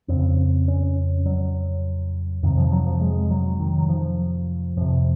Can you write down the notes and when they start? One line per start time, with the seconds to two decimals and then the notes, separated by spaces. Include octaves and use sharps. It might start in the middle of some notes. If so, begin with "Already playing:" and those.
0.08 F2 C#3 C4
0.68 C#4
1.26 F#3
2.43 F2 C3 D#3
2.57 F3
2.72 F#3
2.86 F3
3.01 G#3
3.30 F#3
3.60 D#3
3.79 F#3
3.89 F3
4.77 F2 C3 F3